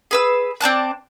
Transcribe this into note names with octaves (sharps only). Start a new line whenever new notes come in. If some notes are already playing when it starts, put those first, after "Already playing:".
G#4 B4 E6
C4 D5 A5 F#6